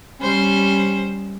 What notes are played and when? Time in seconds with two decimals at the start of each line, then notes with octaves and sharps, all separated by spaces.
0.21 G3 C#4 C5